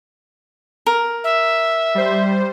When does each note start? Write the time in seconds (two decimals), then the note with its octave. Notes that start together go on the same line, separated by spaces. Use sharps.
0.86 A#4
1.24 E5
1.95 G3 C5